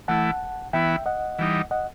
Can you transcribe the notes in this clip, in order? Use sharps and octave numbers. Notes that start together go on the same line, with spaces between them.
E3 A3 E4 F#5 A5
E3 B3 E4 E5 G5
D#5 F#5
E3 G3 D#4
D#5 F#5